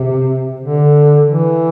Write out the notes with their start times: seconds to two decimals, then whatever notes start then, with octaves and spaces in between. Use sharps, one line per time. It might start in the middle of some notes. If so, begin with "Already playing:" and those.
Already playing: C3
0.60 D3
1.26 E3